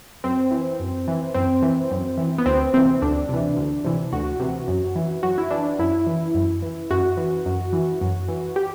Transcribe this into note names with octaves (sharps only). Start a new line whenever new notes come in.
F#2 C4
E3
F#2
E3
F#2 C4
E3
F#2
E3
B3
D2 C4
C3 E3 C4
D2 D4
C3 E3
D2
C3 E3
D2 F#4
C3 E3
F#2
E3
F#2 F#4
E4
E3 D4
F#2 E4
E3
F#2
E3
F#2 F#4
E3
F#2
E3
F#2
E3
G4